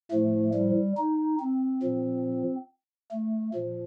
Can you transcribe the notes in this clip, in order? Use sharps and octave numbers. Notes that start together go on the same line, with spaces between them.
A2 F3 A3
G3
D#4
C4
A#2 F3
A3
A#2 F3